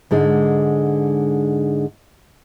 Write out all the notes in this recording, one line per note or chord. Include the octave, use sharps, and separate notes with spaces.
G#2 D3 G#3